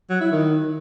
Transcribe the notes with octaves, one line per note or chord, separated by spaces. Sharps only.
F#3
E4
D#3